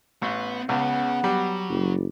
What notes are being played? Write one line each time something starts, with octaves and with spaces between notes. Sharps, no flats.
A1 B3 B4
C#2 B3 C#4 G#4
F#3 G3
F#1